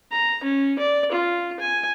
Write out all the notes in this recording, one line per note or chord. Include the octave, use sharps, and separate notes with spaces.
A#5
C#4
D5
F4
G#5